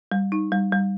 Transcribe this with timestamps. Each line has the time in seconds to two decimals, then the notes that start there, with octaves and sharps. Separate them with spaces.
0.12 G3
0.32 D#4
0.52 G3
0.72 G3